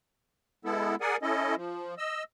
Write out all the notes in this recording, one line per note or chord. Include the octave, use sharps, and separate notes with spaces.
G#3 B3 E4 A4
G#4 A#4 D5 F#5 G#5
C#4 E4 A4 D#5
F3
D#5 E6